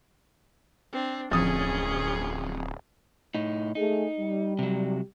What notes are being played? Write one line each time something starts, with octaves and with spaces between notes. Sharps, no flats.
C4 D4
D1 F2 C#4 G#4 D#6 A6
A2 D#4
A3 D#4 G#4
G3
C3 F#3